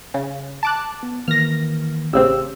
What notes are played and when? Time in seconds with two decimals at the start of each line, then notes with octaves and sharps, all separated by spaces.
0.14 C#3
0.63 A5 D6 F#6
1.03 B3
1.28 D#3 E3 A#3 F6 A#6
2.13 A1 C#3 C4 G4 E6